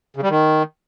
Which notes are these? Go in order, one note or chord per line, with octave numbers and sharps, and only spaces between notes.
C#3
G3
D#3